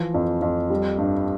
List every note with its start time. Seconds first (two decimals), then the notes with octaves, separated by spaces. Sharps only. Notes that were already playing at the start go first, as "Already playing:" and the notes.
Already playing: E3 F3
0.14 F2
0.42 F2
0.70 G3
0.98 G2